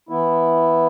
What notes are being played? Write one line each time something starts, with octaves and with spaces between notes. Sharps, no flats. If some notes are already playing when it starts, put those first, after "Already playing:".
E3 B3 E4